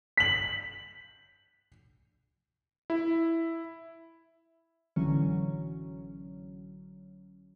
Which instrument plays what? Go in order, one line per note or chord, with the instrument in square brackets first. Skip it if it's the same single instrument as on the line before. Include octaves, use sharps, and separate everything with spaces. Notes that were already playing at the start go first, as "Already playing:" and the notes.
[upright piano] B6 F#7
[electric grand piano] E4
[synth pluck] A1 D3 E3 F#3 C#4